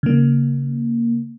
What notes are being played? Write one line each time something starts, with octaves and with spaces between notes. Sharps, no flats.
C#3 A#3